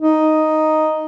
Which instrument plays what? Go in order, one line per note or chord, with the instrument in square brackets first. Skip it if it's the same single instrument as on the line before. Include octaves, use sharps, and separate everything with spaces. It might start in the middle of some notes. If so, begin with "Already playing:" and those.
[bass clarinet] D#4